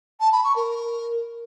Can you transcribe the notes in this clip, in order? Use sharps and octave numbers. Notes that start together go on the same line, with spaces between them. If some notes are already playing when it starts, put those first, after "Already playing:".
A5
B5
C#6
A#4